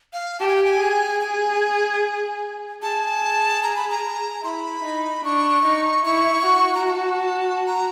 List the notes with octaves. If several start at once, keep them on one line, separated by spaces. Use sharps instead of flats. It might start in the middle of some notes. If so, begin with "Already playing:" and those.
F5
G4 A5
G#5
G5
G#5
G#4
G#5
G#4 A5
A#5
B5
A#5
E4 B5 C6
D#4
D4 C#6
D#4
E4 C#6
F#4
A#5
A#5
A5
A#5